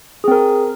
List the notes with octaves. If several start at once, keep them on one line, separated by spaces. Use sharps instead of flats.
C4 G#4 A#4